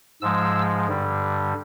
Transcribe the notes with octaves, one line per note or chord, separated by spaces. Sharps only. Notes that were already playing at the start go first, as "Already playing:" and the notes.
G#2 F3 G#3 E6
G2 D3 G3